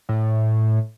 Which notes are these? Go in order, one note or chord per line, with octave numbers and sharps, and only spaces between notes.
A2